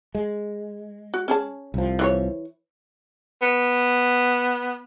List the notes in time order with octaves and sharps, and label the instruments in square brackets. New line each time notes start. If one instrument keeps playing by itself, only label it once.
[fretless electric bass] G#3
[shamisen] F#4
C#4 G#4 A5
[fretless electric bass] C2 F3
[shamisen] E3 F4 C#5
[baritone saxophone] B3